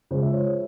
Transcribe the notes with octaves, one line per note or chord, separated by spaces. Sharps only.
C#3 F3 G#3 C5
E5
C#5